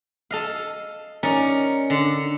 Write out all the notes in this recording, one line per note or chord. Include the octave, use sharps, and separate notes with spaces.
A4 D#5 F5
C#4 D#4 A#4 D5
D3